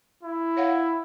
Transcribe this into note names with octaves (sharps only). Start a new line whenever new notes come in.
E4
C#5 F5 F#5